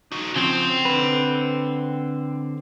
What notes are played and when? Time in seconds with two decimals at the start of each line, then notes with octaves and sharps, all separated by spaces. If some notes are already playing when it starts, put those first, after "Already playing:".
0.12 D#4 F#4
0.36 C#3 F3 C4 F#5 C6
0.85 D3 B4